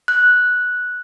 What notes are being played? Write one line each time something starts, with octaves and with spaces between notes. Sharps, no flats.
F#6